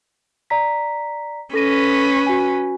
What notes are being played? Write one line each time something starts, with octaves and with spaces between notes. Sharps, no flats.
D5 A#5 B6
C#4 A4 B4 A#6 D#7
F#4 G#5